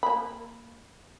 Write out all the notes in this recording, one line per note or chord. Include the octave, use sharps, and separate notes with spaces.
A#3 B5